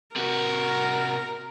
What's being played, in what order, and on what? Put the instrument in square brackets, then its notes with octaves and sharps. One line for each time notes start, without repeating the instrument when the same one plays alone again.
[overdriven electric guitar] C3 F#4 [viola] A#4